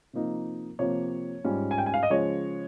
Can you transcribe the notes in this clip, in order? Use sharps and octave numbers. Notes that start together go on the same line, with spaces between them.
C3 F3 A#3 D#4
C3 F3 A#3 C#5
G#2 G3 C#4 F4
G#5
G5
G#5
F5
D#5
C#3 F3 G#3 C#5